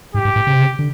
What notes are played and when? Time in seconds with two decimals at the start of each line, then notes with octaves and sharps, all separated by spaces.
0.14 G#2 G4
0.25 G#2
0.36 A2
0.47 C#3
0.54 C3
0.61 C#3
0.79 D3